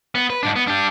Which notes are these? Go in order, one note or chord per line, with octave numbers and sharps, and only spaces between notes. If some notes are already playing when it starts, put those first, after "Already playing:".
B3
B4
G#2 D4
B3
D4 G4